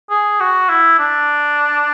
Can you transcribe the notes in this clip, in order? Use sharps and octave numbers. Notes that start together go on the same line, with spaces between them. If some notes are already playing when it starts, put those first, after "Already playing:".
G#4
F#4
E4
D4